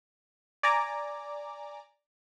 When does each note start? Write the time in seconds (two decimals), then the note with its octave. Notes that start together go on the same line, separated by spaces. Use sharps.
0.63 D5 G#5 A#5 D6